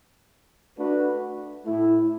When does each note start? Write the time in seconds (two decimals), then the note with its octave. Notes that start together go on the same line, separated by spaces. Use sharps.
0.77 A3 D4 F#4 B4
1.66 A2 A3 E4